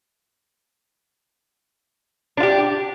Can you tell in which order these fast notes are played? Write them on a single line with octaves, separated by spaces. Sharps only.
D4 F4 G4